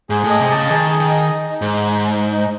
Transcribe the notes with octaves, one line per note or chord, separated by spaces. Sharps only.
G#2 G#4
A2
D#5
C3
C#3 A5
D#3 G#4
G#4
D#3
D#5
D#4
D#4
G#2
D#4
D#4
D#4
D#4